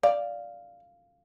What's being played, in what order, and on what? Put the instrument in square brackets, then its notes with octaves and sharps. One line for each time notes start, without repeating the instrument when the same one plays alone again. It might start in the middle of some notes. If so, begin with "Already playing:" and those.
[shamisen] D5 [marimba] F5